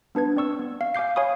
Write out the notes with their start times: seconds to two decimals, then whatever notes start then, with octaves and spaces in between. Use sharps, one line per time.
0.15 B3 D4 B4 G#6
0.36 C4 D5 C#6 E6
0.59 B3
0.81 F5
0.95 F5 G#5 D6 G6 C7
1.16 C#5 F5 G#5 B5 C#6 D#6